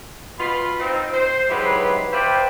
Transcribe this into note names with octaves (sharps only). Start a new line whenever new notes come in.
B2 F4 B5
C4 D#4 F4
C5
G#2 F#3 E4 G4 B4 C6
B4 C5 D5 E5 F5 G5